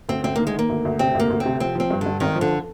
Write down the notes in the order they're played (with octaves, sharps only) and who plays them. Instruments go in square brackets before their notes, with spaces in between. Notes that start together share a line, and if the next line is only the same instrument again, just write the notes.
[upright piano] D2 [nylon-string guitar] C4
[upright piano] D2 [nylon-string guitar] C4
[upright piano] D#3 [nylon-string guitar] A#3
[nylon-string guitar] G#3
[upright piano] D#3 [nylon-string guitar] A#3
[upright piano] D2
D2
[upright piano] C3 [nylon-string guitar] C4
[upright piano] D2 [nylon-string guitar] A#3
[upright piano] D2
[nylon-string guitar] C4
[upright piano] C3
[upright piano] F3 [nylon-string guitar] C4
[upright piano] F3 [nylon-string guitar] C4
[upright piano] G2
[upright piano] G2 [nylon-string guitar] D3
[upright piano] G#1 [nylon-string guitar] D#3
[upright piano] F3
[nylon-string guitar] D3